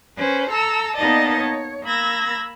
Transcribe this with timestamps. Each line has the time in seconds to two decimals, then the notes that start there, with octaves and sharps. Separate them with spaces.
0.17 C#4 B4 C5
0.51 A4 A#5 E6
0.96 A#3 B3 D#4 D5 D#5 A5
1.36 C#5
1.84 A#3 B5 E6 G#6 A#6